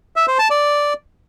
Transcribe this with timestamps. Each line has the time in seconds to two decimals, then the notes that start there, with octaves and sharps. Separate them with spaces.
0.16 E5
0.27 C5
0.39 A5
0.50 D5